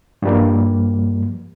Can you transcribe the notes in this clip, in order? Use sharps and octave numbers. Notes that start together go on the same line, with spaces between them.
G2 F3 G3 A#3